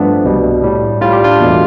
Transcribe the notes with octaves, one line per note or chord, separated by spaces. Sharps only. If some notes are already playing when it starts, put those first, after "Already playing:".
Already playing: G2 F3 A3 B3 D4
C2 B2 G3
A2 G3
A2 G3 F4
G4
D4 F4
E2 B2 A3